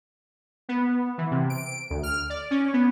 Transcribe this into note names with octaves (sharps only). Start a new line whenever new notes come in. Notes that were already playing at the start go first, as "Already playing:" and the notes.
B3
E3
C3
D7
D2
F6
D5
C#4
B3